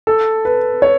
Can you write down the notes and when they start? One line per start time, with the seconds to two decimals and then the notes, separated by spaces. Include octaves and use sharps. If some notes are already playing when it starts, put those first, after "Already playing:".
0.07 A4
0.45 B4
0.82 C#5